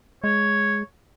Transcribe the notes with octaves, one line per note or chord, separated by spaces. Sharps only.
G#3 C#5